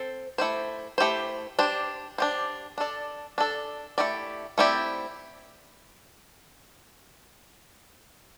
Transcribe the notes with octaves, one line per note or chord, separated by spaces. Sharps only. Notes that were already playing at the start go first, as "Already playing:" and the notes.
Already playing: C4 A4 C5
A3 E4 G4 C5
A3 E4 G4 C5
D4 G4 C5
D4 G4 C5
D4 A4 D5
D4 A4 D5
A3 C4 E4 G4 D5
A3 C4 E4 G4 D5